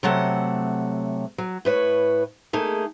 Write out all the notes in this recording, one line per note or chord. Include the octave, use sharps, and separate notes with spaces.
C3 F#3 A3 F#5
F#3
A2 B4 C#5
A3 A#3 D#4 G#4